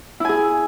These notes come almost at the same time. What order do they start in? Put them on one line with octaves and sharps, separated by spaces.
E4 G#5 G#4